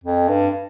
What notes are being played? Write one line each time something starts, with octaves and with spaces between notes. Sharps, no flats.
F2
G2